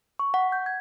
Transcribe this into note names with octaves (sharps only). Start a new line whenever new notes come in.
C#6
F#5
G6
G#6